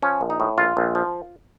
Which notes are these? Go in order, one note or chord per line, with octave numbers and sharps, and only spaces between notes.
F3 C#4
A#1
D#4
A2
A#1 F4
A#1
F3